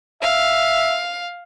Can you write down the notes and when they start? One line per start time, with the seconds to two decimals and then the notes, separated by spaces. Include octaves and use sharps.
0.22 E5 F5